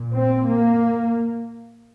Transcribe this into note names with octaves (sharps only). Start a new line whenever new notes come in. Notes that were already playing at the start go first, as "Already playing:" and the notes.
Already playing: A#2
C4
A#3